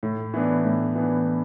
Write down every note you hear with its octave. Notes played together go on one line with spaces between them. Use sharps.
A2
E3 B3 D4
A2
E3 B3 D4